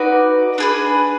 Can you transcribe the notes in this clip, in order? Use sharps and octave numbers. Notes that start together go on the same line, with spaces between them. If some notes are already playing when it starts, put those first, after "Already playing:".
Already playing: D#4 F#4 B4 D5
D4 G#4 B4